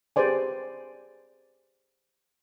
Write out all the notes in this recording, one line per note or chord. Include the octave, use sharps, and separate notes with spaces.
G4 G#4 B4 C5 D5 G#5